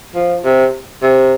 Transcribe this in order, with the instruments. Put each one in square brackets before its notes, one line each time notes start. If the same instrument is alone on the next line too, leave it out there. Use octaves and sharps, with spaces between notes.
[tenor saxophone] F3
C3
C3